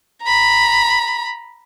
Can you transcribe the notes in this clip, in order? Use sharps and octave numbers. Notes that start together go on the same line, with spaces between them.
A#5 B5